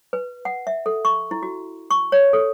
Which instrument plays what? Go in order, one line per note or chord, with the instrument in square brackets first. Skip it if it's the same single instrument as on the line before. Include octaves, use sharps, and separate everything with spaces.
[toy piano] B4
F#5
E5
A4
C#6
E4
F#4
C#6
C#5
A4